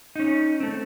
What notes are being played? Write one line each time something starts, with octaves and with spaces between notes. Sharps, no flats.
C#4 D#4
A3 C4